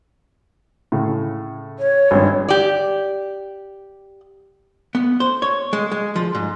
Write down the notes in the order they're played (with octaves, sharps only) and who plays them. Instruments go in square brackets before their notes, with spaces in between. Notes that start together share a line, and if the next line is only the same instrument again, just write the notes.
[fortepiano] A2 C#3
[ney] C#5
[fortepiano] G#1 G2
[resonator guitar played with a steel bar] G4 D5
[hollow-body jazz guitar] B3
C5
C#5
G#3
G#3
F3
G#2